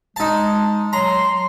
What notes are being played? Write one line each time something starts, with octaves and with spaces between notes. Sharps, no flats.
G#3 D#4 A5
F#3 A#5 C6